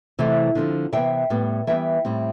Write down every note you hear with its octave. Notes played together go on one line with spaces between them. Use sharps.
C3 E3 A3 C4
D3 F3 C4
C3 E3 B3 E5 G5
A2 G3 B3
E3 G3 B3 E5 G5
A2 G3 C4